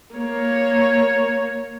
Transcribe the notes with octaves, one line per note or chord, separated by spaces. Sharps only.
A#3 C#5